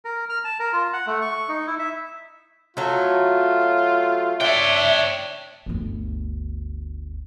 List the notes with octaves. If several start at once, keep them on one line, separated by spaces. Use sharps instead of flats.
A#4
F6
A5
A#4
F4
F#5
A3
C#6
D#4
E4
E5
F#3 A3 F4
D4 C#5 E5 G5
G1 D2